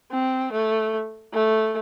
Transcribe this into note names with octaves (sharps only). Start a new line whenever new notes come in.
C4
A3
A3